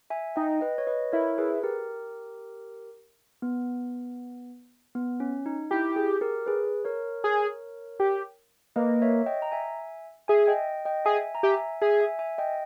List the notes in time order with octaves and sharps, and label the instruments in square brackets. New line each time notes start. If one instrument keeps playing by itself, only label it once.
[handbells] E5 G#5
[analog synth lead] D#4 [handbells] D#5 G5
[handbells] B4 D#5
C#5
B4 D#5
[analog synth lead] E4 [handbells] A#4 C#5
[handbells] G#4 B4
G4 A#4
B3
B3
C#4
D#4
[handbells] E4 [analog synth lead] G4
[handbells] G#4
G4 A#4
G#4 B4
A#4 C#5
[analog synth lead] G#4
G4
[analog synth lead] A#3 [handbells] B4 D#5
[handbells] C#5 E5
D#5 G5
A#5
E5 G#5
[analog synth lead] G#4 [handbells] E5 G#5
[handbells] D#5 G5
D#5 G5
[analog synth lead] G#4 [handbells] E5 G#5
[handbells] A#5
[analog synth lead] G4 [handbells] E5 G#5
[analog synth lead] G#4 [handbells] E5 G#5
[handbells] E5 G#5
E5 G#5
D#5 G5